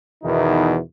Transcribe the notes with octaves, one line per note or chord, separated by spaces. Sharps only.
E2 B2 D#3 E3 D#4 E4